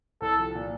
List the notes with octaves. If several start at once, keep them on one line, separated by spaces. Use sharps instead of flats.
C2 A4
F3
A#2